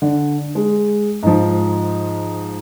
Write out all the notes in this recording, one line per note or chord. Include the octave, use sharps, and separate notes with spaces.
D3
G#3
G#2 F3